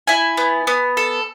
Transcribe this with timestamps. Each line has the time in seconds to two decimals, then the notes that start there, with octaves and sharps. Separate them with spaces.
0.07 E4 G#5
0.37 B3
0.67 B3
0.97 A4